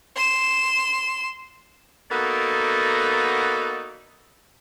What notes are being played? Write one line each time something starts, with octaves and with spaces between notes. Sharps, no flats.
C6 E7
A#3 B3 D#4 F#4 A4 D5